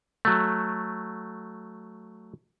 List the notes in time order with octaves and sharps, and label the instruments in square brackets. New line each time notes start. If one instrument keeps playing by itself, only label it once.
[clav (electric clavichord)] F#3 A3